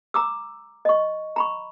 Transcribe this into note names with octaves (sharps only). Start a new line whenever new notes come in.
A#5 D6 E6
D#5 C#6
A#5 B5 C#6